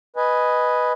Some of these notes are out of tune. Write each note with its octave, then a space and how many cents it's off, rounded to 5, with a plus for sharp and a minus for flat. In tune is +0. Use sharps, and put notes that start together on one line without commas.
B4 +0 D#5 +0 G#5 +0